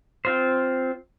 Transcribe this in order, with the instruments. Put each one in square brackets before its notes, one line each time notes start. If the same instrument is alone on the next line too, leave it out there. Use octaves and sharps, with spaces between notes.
[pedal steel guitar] C4 F4 C5